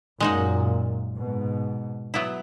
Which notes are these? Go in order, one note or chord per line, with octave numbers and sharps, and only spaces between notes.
F#2 A#2 G#3 D#4 F#4
G#2 B2
F#3 B3 E4